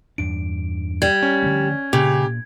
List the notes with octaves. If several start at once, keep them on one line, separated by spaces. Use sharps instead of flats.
E2 G2 D4 D7
G3 G#6
C#4
D3 F3 A3
A#2 C#3 G4